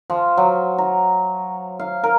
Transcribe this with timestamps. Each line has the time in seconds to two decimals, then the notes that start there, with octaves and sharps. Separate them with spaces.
0.10 F3
0.37 F#3
0.78 A#5
1.79 F5
2.04 A#4